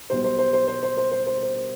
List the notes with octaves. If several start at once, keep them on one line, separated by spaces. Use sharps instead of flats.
B1 B2 G3 C5
C5
C5
C5
C5
C5
C5
C5
C5
C5